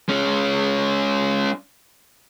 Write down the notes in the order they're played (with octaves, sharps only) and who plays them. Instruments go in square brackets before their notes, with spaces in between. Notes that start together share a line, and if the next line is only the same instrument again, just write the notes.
[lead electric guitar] G#3 C#4